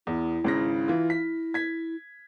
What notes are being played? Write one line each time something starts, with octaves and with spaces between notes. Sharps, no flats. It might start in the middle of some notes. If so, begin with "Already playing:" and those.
E2 E4
G#1 C#3 A#6
E3 F4
B6
G#6 B6